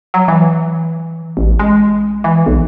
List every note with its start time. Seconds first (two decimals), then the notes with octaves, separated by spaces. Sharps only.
0.14 F#3
0.28 E3
1.37 A1
1.59 G#3
2.24 E3
2.46 B1